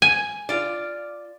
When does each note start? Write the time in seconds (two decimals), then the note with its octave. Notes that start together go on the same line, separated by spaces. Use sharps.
0.02 G#5
0.49 F4 D5